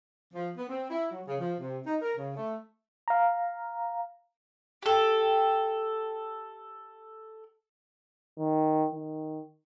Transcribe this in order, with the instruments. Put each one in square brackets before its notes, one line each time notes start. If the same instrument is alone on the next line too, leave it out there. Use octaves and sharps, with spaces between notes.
[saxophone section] F3
B3
C4
E4
F#3
C#3
F3
C3
D#4
A#4
C#3
A3
[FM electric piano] F5 A#5
[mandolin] G4 A4
[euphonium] D#3
D#3